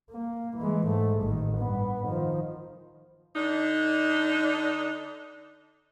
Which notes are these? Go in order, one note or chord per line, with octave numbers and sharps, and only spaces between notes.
A#3
E3 G#3
G#2 A3
A1 D#3
G2 B3
D#3 F3
D3 D4 D#4